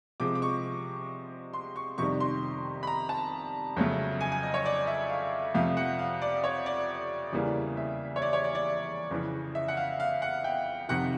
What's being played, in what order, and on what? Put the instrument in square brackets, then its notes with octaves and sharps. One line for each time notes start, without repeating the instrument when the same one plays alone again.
[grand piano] C3 F3 G#3 D6
D6
C#6
C6
C#6
F2 C3 D#3 G3 C#6
C6
B5
A#5
A5
F2 C#3 F#3 A3
G#5
G#5
D#5
C#5
D5
E5
F5
F2 C3 F3 A3 F5
F#5
F5
D5
C#5
D5
E2 C#3 E3 G3 A#3
E5
C#5
D5
C#5
D5
D5
F2 C#3 E3
E5
F#5
F5
F5
F#5
G5
F2 C3 D#3 F#5